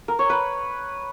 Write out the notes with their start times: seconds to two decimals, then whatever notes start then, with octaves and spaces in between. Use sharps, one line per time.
0.08 A#4
0.19 C#5
0.30 B4